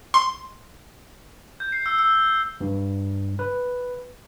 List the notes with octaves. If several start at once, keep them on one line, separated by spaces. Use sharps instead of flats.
C6
G6
C7
E6
E6
G2
B4